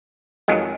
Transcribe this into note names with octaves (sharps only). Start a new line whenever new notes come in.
F2 D#3 F#3 G#3